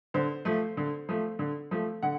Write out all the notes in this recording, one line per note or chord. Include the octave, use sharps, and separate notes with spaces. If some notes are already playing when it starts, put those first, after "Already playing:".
D3 C5
F3 A3
D3
F3 A3
D3
F3 A3
D3 F#5